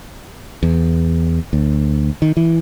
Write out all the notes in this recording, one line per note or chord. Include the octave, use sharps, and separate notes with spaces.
E2
D2
D#3
E3